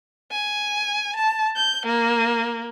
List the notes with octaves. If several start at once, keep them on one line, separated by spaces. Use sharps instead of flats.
G#5
A5
G6
A#3